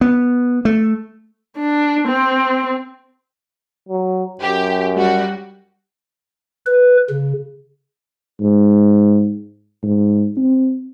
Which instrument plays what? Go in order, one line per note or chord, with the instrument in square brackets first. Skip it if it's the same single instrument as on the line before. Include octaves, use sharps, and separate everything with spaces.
[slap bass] B3
A3
[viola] D4
C4
[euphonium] F#3
[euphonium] F#2 [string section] G4
[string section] G3 F#4
[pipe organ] B4
C#3
[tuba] G#2
G#2
C4